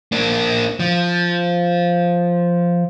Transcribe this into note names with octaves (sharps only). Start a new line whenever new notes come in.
A#3 D4
F3